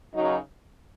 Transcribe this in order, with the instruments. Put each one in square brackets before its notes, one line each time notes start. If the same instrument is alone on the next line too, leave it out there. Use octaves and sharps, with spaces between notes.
[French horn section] F#2 C#3 F#3 D#4